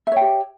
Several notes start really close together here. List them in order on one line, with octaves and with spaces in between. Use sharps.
E5 C#5 G5 G4